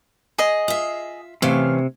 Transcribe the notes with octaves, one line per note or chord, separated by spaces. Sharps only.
G#4 D#5
F4 E5
C3 E3 A3 C#4 F5